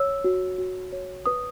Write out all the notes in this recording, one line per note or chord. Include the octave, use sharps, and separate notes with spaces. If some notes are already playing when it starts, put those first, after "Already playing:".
Already playing: C#5 E6
F#4
F#4
C#5
B4 D#6